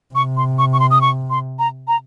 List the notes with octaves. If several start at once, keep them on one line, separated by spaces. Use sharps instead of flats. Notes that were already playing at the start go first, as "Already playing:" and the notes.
C3 C#6
C6
C#6
C#6
C6
D#6
C#6
C6
A#5
A#5